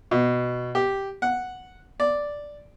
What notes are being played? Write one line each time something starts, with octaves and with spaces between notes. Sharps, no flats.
B2
G4
F#5
D5